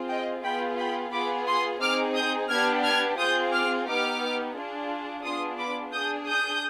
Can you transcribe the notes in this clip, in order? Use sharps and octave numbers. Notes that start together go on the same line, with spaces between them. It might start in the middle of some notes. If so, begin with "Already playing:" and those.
Already playing: C4 F4 G#4
D#5 G5
B3 F4 G#4 G5 B5
G5 B5
B3 F4 G#4 B5 D6
C6 D#6
C4 D#4 G#4 D6 F6
D#6 G6
B3 D4 G4 F6 G#6
F6 G#6
C4 F4 G#4 D#6 G6
D6 F6
B3 D#4 G4 D6 F6
D4 F4 G#4
B3 D4 F4 G#4 C6 D#6
B5 D6
D4 G#4 D#6 G6
D#6 G6